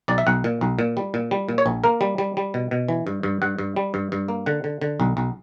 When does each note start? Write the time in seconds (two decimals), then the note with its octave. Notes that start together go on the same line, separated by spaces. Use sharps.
0.08 B1 D5
0.18 E5
0.27 B1 F#5
0.44 A#2
0.61 B1
0.79 A#2
0.97 G3
1.14 A#2
1.31 G3
1.49 A#2
1.58 C#5
1.66 A#1
1.84 A#3 A#4
2.01 G3
2.18 G3
2.37 G3
2.54 B2
2.71 B2
2.88 E3
3.07 G2
3.23 G2
3.42 G2 F#5
3.58 G2
3.76 G3
3.94 G2
4.12 G2
4.28 A#3
4.46 D3 F#5
4.64 D3
4.81 D3
5.00 B1
5.17 B1